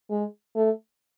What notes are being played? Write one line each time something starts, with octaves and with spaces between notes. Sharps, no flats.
G#3
A3